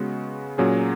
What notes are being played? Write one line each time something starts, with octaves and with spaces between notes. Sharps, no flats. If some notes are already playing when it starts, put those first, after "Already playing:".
Already playing: C#3 G#3 B3 F#4
A#2 F#3 C#4 G#4